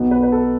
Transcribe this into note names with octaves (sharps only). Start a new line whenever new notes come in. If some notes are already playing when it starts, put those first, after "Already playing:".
Already playing: B1 B2 B3
B4
B4
A4